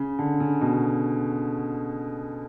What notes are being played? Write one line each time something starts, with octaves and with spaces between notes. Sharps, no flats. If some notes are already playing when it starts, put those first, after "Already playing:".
Already playing: C#3
D3
C#3
B2